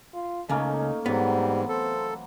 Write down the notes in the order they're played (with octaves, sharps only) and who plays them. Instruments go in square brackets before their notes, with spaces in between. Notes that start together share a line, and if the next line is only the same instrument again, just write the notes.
[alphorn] F4
[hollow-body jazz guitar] C#2 C#3 [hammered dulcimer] A3 A#3 C#4 [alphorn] D#4
[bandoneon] G#2 [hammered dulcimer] E3 F#3 C4 [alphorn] G3 [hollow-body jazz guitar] B3
[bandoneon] A4 [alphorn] C5